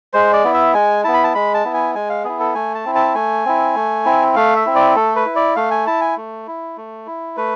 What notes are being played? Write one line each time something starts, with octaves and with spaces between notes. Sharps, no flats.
G#3 C5
D5
B3 E4
E5
G#3 G#5
B3 E4 A5
B5
A5
G#3 B5
A5
B3 E4
G#5
G#3 G#5
F5
B3 E4 G#4
A4
A3 G#5
A5
C4 E4
A5
A3 G#5
C4 E4
A3
C4 E4
A3 F5
E5
C4 E4
D5
A3 A4
B4
E4
D5
A3 F5
G#5
E4 A5
G#5
A3
E4
A3
E4
A3 B4